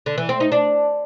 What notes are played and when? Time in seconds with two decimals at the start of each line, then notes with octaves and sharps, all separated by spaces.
0.06 D3
0.18 E3
0.29 C4
0.40 D#4
0.52 D4